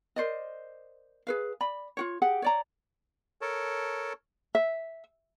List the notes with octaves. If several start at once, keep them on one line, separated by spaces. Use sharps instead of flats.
A#4 C5 D5 D#5
G#4 B4 F5
D5 B5
F4 F#4 C#5
G4 G#4 F#5
C#5 D5 A#5
A4 A#4 C#5 A5
E5